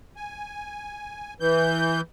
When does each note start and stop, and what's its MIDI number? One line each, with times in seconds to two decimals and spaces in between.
0.16 1.34 80
1.40 2.01 52
1.40 2.01 91